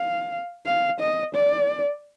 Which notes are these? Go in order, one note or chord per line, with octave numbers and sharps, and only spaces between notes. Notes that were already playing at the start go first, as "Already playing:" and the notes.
Already playing: F5
F5
D#5
D5